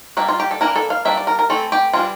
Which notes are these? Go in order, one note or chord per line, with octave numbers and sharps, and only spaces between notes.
G3 A#3 D4 E5
F4
G4
A4
E3 A#3 D4 A#4
A4
F5
G3 A#3 D4 E5
D5
A#4
A#4
E3 A3 C4 A4
G4
E3 G3 D4 F4